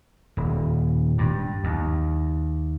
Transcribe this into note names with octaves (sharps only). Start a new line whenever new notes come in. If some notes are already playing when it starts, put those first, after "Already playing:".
D#1
G2
D#2